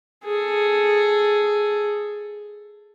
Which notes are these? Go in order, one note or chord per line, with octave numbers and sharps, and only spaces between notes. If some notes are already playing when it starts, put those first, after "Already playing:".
G#4 A4